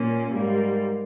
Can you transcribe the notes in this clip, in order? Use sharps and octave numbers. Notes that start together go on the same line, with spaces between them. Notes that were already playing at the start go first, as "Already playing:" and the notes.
Already playing: A#2 A#3 C#4
G#2 G3 A#3